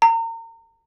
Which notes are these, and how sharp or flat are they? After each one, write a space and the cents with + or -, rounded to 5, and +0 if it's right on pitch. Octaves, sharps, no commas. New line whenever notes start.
A#5 -35